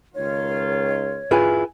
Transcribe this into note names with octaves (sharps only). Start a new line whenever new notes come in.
C#2 D#3 F4 C#5
E4 F4 G#4 B4 G#5